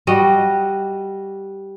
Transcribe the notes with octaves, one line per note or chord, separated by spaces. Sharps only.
G3 F#4 D#5